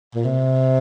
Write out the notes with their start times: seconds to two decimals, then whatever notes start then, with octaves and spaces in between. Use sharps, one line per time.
0.15 A#2
0.25 C3